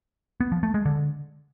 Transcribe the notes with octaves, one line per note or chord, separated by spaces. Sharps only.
B3
F3
A3
G#3
D3